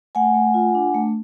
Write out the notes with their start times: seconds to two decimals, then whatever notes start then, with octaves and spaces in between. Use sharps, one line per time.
0.15 A3 F#5 G#5
0.34 A3
0.54 F4
0.75 D4
0.94 A3